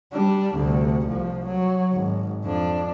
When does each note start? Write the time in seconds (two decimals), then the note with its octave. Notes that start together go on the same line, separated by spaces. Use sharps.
0.13 G3 D4
0.56 D2 C3
1.08 C2 F3
1.46 F#3
1.93 G#1
2.44 F2 D4